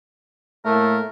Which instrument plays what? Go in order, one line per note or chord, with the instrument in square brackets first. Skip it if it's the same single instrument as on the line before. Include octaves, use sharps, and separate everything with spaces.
[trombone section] A2 A3 A#3 [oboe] A#4